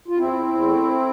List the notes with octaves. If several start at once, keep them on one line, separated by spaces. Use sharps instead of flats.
F4
E2 C4 E4
E2
E2
A3